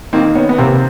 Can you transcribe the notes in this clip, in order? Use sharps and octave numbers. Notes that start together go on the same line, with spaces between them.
D#3 A#3 C4
B3 C#4
B3
C3 A#3 C4
C4